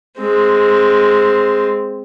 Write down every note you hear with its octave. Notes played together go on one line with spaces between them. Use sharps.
G#3 C4